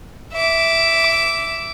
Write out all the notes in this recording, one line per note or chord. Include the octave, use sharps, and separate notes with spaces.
E5 D6